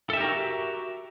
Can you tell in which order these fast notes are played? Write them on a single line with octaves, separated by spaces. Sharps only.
A4 E5 G4 A#4 F#4